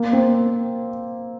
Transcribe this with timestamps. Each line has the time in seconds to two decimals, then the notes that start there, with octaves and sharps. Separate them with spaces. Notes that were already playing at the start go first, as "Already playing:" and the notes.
Already playing: A#3
0.13 C4